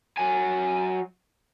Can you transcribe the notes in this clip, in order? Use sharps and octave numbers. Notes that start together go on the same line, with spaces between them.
F#3 G#5